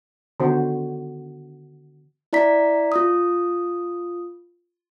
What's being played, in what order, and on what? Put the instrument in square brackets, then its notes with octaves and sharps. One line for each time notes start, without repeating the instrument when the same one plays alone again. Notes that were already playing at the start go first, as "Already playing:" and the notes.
[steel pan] D3 D#3 B3 F#4 C5
[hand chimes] E4 D5 A#5 B6
F4 D#6